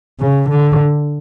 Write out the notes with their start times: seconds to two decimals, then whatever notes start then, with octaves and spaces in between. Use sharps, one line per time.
0.20 C#3
0.50 D3